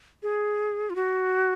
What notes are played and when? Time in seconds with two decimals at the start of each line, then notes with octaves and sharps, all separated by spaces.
0.23 G#4
0.90 F4
0.95 F#4